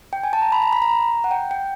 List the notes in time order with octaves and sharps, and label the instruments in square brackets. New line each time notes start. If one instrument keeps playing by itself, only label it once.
[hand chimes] G5
G#5
A5
A#5
B5
A#5
B5
A#5
F#5
G5
G5